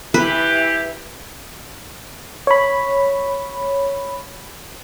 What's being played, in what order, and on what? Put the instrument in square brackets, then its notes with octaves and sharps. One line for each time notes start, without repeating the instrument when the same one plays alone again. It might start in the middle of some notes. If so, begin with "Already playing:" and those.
[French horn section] E3 G4 [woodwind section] E4 E5 [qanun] B4
[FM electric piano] C#5 B5